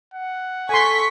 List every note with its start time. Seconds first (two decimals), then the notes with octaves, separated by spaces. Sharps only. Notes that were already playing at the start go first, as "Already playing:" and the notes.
0.14 F#5
0.69 A4 G#5 C6 C#6 B6